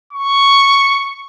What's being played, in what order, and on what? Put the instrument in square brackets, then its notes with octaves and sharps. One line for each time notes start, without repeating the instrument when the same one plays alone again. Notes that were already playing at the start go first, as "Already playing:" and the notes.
[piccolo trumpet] C#6